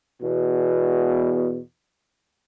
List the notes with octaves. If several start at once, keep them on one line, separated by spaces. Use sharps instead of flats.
E2 B2